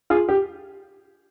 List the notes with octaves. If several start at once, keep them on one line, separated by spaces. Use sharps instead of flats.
F4 G#4
G4